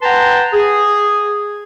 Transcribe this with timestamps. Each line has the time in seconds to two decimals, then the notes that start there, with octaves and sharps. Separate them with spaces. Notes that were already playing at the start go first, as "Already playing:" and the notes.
0.03 B4 F#5 G5 A5 A#5 C6
0.54 G#4